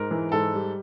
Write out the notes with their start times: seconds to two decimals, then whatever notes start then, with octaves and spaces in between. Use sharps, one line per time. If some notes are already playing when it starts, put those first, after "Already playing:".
Already playing: G#2 A#4
0.11 E3
0.32 G#2 A4
0.54 G3